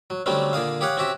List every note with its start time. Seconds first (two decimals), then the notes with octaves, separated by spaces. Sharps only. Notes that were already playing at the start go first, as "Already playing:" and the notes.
0.10 F#3
0.26 D3 F#3 G3 A3 C4 C#4
0.53 A#2 D3 G#4 F5
0.81 G4 G#4 C#5 F5 F#5
0.97 C4 C#4 F#4 G4 E5